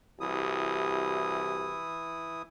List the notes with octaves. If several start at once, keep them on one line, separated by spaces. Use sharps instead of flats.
C2 E3 E4 F#4 G4 D#6